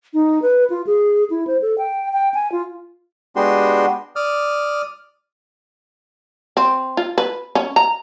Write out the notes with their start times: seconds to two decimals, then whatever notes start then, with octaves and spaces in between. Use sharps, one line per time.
0.14 D#4
0.42 B4
0.70 F4
0.87 G#4
1.30 E4
1.47 C5
1.62 A4
1.78 G5
2.13 G5
2.34 G#5
2.52 F4
3.36 G#3 B3 D4 F#4 G4 C6
4.16 D5 D#6 F6
6.57 C4
6.97 F4
7.18 B4
7.55 C#4
7.76 A#5